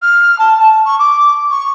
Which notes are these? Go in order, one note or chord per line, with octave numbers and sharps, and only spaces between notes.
F6
A5
A5
C#6
D6
C#6